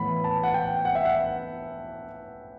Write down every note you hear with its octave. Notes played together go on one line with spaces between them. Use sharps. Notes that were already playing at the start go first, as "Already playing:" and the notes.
Already playing: A2 E3 B3 B5
A5
F#5
G5
F#5
E5
F#5